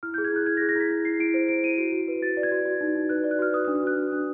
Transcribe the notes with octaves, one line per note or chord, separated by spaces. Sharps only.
E4 F6
G#4 G6
G#6
E4 F#6
E4 G#6
A#6
G#4
A#6
E4 B6
E4
E4 C7
E4 D7
C5 D7
E4 D7
E4 D#7
F#4 D7
F#4
B4
F#4 A6
D5
G#6
F#4
F#4
D#4
D#4
B4 F#6
D5
F#6
F#4 F6
B4 D#6
D#6
D4
D#6
F#4 F#6
D4
D4